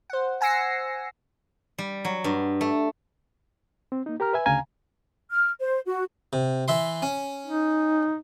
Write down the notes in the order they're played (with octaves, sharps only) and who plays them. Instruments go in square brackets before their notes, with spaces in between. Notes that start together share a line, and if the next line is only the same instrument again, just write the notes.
[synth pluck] C5 F#5
F#5 G#5 E6 A#6 C7 C#7
[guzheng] G3
F#3
G2
A3
[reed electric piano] C4
A#3 D#4
G4 A#4 A#5 F6
B4 E5 G#5
D2 C#3 F5 G#5 A#5
[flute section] F6
C5
F#4
[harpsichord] C3
E3 E5 C6
C#4
[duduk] D#4